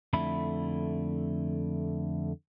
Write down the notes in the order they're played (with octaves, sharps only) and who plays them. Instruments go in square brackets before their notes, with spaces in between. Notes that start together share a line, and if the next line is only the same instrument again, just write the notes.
[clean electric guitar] F2 D3 A3 E4 B5